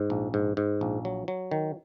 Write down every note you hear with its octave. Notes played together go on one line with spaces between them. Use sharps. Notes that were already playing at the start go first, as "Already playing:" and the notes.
Already playing: G#2
A#1
G#2
G#2
A#1
F#3
F#3
D#3